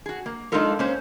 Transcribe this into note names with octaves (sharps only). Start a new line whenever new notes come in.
F#4 G#4
A#3
G#3 D4 D#4 F4 A4 A#4
A#3 C#4 C5